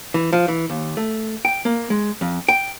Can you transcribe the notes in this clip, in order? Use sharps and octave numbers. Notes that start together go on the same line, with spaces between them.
E3
F3
E3
D#2
A3
G5
A#3
G#3
F2
G5